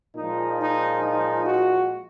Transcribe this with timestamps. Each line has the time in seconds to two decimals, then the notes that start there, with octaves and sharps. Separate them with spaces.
0.16 A#2 F3 G#3 D#4
0.60 D#4
1.03 D#4
1.46 F#4